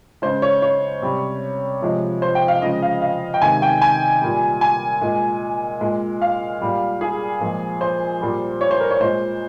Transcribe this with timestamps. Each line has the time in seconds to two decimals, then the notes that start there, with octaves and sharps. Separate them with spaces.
0.22 C#3 G#3 C5
0.42 C#5
0.62 C#5
1.02 C3 G3
1.82 C3 F3 G#3
2.22 C5
2.35 G5
2.48 F5
2.62 C#3 F3 G#3 D#5
2.82 F5
3.02 F5
3.34 G5
3.42 C3 D#3 G#3 G#5
3.62 G5
3.82 G#5
4.22 A#2 G3
4.61 G#5
5.01 A#2 G#3
5.81 A#2 G#3
6.22 F5
6.61 A#2 G3
7.01 G#4
7.41 A#2 F3 G#3
7.81 C5
8.21 A#2 G3
8.61 C#5
8.71 C5
8.80 A#4
8.91 C#5
9.01 A#2 G#3 C5